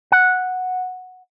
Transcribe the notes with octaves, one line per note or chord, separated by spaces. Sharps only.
F#5